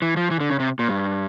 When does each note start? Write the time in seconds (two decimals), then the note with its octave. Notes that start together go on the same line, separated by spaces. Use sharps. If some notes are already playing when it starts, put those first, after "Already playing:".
0.02 E3
0.17 F3
0.31 E3
0.40 D3
0.50 C#3
0.60 C3
0.79 A#2
0.89 G2